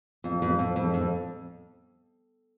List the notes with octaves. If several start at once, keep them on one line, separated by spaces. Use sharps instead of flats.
F2
F2
F2
F2
F2